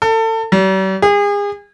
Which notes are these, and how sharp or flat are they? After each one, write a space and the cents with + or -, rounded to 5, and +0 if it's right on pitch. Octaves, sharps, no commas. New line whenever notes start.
A4 +30
G3 -45
G#4 -35